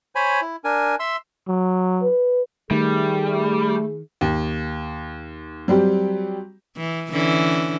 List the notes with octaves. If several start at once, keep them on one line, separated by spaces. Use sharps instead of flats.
C5 C#5 G#5 B5
E4
D4 A#4 G#5
E5 C6 E6
F#3
B4
D#3 G3 A3 G#4
D#2
F#3 G3 C4 G4
E3
D3 E3 C#4